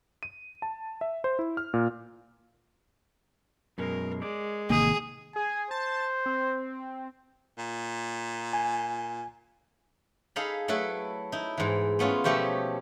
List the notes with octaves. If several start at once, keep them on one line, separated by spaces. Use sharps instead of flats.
D#7
A5
E5
C5
E4
F6
A#2
F#2 B2 G#3 A#4
G#3 D5
A1 C3 D#3 A#3 G#4
G#4 G#5
C5 A5
C4
A#2
G#5
D#4 G#4 A4 F5 A#5 B5
F#3 A3 E4 A4 B4
D#4 E4
G#2 E3
A3 B3 C#4 F4
B2 F3 A3 G4 C#5 E5